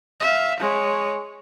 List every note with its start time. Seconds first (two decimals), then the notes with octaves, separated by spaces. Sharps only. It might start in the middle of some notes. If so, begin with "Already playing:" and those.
0.20 E5 F5
0.60 G#3 C#5